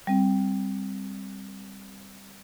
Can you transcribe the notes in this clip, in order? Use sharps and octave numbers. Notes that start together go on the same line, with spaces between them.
G3 C4